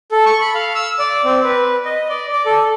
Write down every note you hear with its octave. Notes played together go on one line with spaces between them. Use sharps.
A4
C#6
B5
F5
E6
D5
C4
B4
D#5
D5
D5
A4